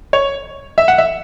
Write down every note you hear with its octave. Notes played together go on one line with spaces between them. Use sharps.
C#5
E5
F#5
E5